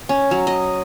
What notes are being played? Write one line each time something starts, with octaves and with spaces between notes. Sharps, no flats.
C#4
F#3
D#5